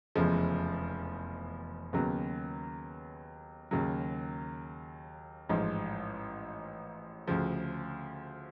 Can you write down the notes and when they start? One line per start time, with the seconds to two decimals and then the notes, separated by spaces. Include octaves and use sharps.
0.15 F1 E2 C#3 F3 G#3
1.93 D#2 C#3 F#3 B3
3.71 D#2 C#3 F#3
5.49 A1 G#2 F3
7.27 D2 C#3 F3